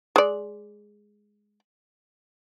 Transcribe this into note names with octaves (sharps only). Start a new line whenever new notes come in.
G#3 D5